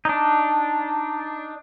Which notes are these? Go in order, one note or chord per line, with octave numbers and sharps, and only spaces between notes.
D4 D#4